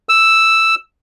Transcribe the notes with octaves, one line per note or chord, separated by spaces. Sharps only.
E6